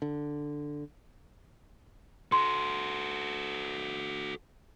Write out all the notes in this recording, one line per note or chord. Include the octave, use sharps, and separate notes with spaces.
D3
F#4 A4 C6